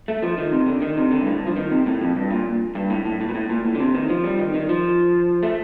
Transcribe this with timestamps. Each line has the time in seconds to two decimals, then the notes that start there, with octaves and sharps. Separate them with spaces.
0.08 A3
0.22 F3
0.38 D#3
0.52 C3
0.67 D3
0.82 D#3
0.97 C3
1.11 D3
1.21 G2
1.27 A2
1.37 G2
1.46 F3
1.56 D#3
1.71 C3
1.86 A2
2.01 F2
2.16 G2
2.31 A#2
2.75 G2
2.90 A2
3.05 A2
3.21 A2
3.29 A#2
3.35 A2
3.49 A#2
3.65 A2
3.75 D3
3.80 C3
3.95 D#3
4.09 F3
4.24 G3
4.39 D#3
4.54 D#3
4.69 F3
5.43 A3